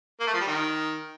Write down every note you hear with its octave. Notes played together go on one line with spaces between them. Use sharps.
A#3
A3
F3
G3
D#3